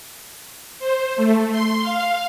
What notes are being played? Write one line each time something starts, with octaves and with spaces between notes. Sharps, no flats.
C5
A3
C6
F5